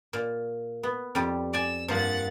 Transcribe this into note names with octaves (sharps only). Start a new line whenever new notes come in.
A#2
B3
F2 G3
D5 G#5 E6
G2 F3 A#3 F#5 A6